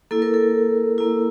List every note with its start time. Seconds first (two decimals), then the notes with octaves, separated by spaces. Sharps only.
0.11 A#3 E4 A4
0.22 A#4
0.34 A4
0.98 A#3 E4